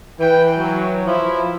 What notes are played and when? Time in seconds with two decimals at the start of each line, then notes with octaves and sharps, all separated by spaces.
0.20 E3 B4 G5
0.57 F#3
1.07 F3 E4